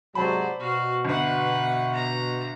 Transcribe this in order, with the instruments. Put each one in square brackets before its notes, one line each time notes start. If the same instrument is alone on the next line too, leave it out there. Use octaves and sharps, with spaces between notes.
[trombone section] G#2 C3 F#3 [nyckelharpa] C5 D5 [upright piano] A5 B5
[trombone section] B2 [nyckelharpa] F#4 F5
[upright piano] G1 [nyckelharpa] B4 F#5
[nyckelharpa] A#5